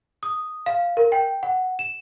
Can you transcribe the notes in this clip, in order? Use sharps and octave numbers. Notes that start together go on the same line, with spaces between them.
D#6
F5
A#4
G5
F#5
E7